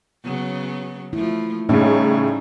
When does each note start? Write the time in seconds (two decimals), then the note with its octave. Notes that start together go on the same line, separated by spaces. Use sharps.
0.24 C#3 F#3 B3
1.13 F3 A3 E4
1.69 A2 C#3 G3 C#4 D#4